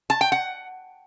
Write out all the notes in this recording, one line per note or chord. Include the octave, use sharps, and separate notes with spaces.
A5
G5
F#5